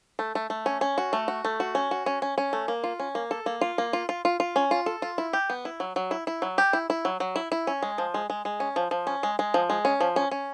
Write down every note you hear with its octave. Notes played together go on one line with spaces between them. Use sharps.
A3
A3
A3
C#4
C#4
F#4
A3
F#4
A3
F#4
C#4
F#4
C#4
C#4
C#4
A3
A#3
F4
C#4
A#3
A4
A#3
F4
A#3
F4
F4
F4
F4
C#4
F4
A4
F4
E4
G4
B3
E4
F#3
F#3
E4
E4
F#3
G4
E4
E4
F#3
F#3
E4
E4
C#4
G#3
F3
G#3
G#3
G#3
C#4
F3
F3
C#4
G#3
G#3
F3
G#3
C#4
F3
C#4
C#4